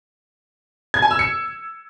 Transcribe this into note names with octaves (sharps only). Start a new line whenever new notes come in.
G#6
G#5
E6
C#7